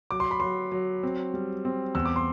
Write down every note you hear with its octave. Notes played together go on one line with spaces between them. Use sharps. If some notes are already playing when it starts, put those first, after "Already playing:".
F#3 D6
C6
B5
F#3 C6
F#3
C4
G3
C4
E2 E6
D6
C6